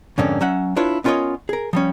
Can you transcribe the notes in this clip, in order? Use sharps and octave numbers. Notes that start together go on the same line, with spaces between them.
F2 G#2 D3 A#3 C#4 D4
F#3 C#4 E5 F#5
D4 E4 F4 B4 C#5
B3 C#4 F4 A#4 C#5 D#5
G#4 A#4
F3 G3 C#4